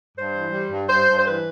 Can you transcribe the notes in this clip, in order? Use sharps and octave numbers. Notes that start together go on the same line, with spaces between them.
G2 C5
E3
G3
G2
G2 C5
G2
C5
E3 B4